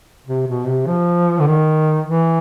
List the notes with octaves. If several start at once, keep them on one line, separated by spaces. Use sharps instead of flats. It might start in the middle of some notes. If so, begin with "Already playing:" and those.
C3
B2
C3
F3
D3
D#3
E3